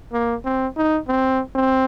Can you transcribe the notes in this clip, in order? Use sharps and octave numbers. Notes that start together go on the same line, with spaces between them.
A#3
C4
D#4
C4
C4